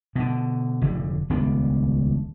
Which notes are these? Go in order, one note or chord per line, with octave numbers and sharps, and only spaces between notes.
B2 D3
F1 D3
D#1 C#2 B3 D4